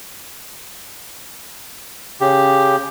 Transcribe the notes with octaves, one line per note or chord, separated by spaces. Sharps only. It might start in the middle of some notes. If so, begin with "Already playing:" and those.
C#3 G4